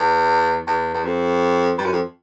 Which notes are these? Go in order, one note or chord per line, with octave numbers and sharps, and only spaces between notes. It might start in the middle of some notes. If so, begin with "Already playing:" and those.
Already playing: E2
E2
E2
F2
G2
F#2
F2